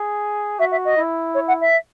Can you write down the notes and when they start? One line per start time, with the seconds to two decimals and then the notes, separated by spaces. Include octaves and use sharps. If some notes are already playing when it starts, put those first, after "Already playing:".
Already playing: G#4
0.59 F#4 E5
0.71 E5
0.85 D#5
0.97 E4
1.34 C#5
1.48 F#5
1.61 E5